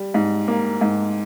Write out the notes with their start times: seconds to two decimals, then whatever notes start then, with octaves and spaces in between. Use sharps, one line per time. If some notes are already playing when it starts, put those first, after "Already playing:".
Already playing: G3
0.14 G#2
0.48 A#3
0.81 G#2